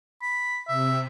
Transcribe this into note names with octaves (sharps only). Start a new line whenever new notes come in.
B5
C3 E5